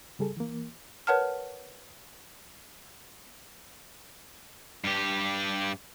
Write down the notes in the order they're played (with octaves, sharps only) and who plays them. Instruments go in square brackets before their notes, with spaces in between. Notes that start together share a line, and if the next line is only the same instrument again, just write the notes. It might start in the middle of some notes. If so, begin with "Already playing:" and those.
[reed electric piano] C#3 G3 G#4 A4
E3 A#3
[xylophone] A#4 B4 C#5 F#5 A5 F6
[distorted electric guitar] G2 G4